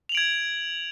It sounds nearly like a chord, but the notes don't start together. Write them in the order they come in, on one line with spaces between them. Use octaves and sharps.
F7 F#7 D7 G#6